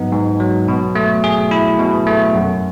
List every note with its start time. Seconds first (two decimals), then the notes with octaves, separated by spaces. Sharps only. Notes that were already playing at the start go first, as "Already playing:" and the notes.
Already playing: G#2 F#3 B3 D#4
0.12 G#2
0.40 F#3
0.68 B2
0.95 A3
1.24 G#4
1.51 E4
1.79 B2
2.07 A3
2.35 F#2